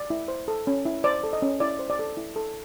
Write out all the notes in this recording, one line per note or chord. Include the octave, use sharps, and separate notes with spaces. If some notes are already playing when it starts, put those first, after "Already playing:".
Already playing: D5
E4
C5
A4
C#4
E4
C5 D5
A4
D#5
C#4
E4 D5
C5
D5
A4
E4
A4